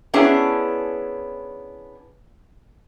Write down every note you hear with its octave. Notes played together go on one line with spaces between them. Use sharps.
B3 C#4 D4 E4 G#4